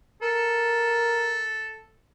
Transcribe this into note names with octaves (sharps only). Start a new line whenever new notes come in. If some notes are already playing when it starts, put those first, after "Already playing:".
A4 A#4